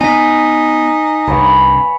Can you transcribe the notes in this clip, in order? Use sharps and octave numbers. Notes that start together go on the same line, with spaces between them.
B3 D#4 G#5 B6
C2 G2 B4 C#5 F5